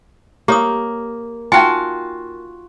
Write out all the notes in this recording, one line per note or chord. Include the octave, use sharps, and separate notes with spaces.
A#3 G4 C#5 D#6
D#4 F4 F#4 G5 G#5